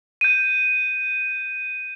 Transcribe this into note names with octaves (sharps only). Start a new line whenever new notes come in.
G6 D#7